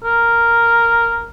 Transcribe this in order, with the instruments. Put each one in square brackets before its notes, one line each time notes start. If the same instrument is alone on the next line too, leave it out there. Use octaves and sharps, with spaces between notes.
[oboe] A#4